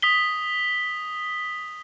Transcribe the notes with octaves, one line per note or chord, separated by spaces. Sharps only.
D#6 B6 G7